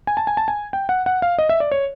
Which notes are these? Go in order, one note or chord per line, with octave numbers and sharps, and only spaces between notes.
G#5
A5
G#5
A5
G#5
G5
F#5
F#5
F5
D#5
E5
D5
C#5